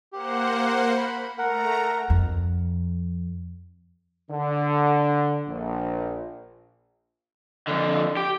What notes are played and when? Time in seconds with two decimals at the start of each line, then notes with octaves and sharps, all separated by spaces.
0.13 A#3 G4 C5 F#5
0.98 B5
1.38 A3 A#4 F#5 A#5
2.10 F2
4.29 D3
5.48 A#1
7.68 F2 D3
8.17 G4